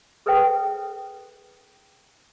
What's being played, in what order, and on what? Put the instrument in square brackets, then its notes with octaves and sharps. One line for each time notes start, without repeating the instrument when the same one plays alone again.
[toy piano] G#4 A4 B4 C5 E5 G5